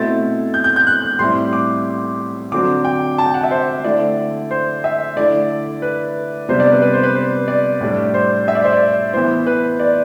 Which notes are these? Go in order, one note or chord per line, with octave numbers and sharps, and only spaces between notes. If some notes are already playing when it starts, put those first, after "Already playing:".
Already playing: B2 A3 C4 E4 A6
G6
G6
G6
F#6
A2 G3 C4 E4 C6
D6
D3 F#3 C4 D6
G5
A5
G5
F#5
E5
C5
D3 A3 E4 D5
C5
E5
D3 A3 E4 D5
B4
C3 G3 B3 D4 C5
D5
B4
B4
C5
B4
C5
D5
A2 G3 D4
C5
E5
D5
C5
D5
E3 B3 E4 C5
B4
D5